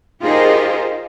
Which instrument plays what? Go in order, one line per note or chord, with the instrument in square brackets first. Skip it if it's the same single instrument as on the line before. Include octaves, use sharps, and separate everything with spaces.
[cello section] D#4 F4 G4 G#4 A#4 C5